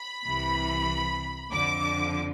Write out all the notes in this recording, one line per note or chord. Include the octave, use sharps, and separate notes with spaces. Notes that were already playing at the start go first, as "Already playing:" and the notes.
Already playing: B5
C2 C3 E3
F2 D3 F3 D6